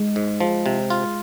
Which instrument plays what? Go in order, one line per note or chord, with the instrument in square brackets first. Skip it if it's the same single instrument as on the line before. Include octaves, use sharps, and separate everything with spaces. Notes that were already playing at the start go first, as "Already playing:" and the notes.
Already playing: [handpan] G#3
[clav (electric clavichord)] G#2
F3
C3
F4